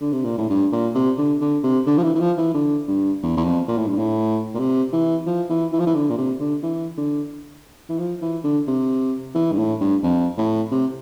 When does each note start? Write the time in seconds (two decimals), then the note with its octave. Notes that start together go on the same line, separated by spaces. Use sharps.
0.01 D3
0.13 C3
0.25 A#2
0.38 A2
0.50 G2
0.72 A#2
0.95 C3
1.18 D3
1.41 D3
1.64 C3
1.87 D3
1.98 F3
2.03 E3
2.15 E3
2.20 F3
2.37 E3
2.54 D3
2.88 G2
3.23 E2
3.37 E2
3.45 F2
3.68 A#2
3.77 A2
3.88 G2
3.98 A2
4.55 A#2
4.59 C3
4.93 E3
5.26 F3
5.50 E3
5.73 E3
5.80 F3
5.87 E3
5.95 D3
6.10 A#2
6.18 C3
6.40 D3
6.63 E3
6.98 D3
7.90 E3
7.99 F3
8.22 E3
8.44 D3
8.67 C3
9.35 E3
9.52 G2
9.59 A2
9.81 G2
10.03 F2
10.38 A2
10.71 C3